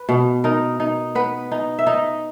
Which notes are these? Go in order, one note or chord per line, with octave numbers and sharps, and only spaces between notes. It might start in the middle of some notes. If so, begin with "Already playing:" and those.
Already playing: B4
B2
D#4 A#4
D#4
B3 B4
D#4
E5
D#4 D#5